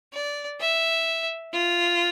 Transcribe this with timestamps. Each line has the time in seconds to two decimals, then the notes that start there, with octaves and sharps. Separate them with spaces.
0.13 D5
0.60 E5
1.53 F4